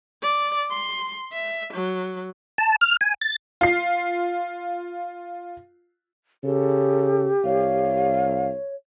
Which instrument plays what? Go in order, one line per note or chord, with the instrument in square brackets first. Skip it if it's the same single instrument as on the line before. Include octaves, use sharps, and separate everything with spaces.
[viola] D5
C6
E5
F#3
[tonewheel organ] A5
F6
G#5
A6
[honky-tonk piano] F4 C7
[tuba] C#3 [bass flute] G4 [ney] A4
[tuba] C2 [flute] C#5 [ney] F5